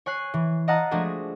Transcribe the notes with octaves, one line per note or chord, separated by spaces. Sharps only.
C#5 G#5 F#6 C7
E3
D#5 F5 F#5 A5 A#5 D#6
F3 G#3 A3 D4 F#4 G#4